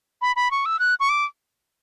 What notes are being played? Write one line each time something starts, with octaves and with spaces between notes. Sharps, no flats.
B5
B5
C#6
E6
F#6
C#6
D6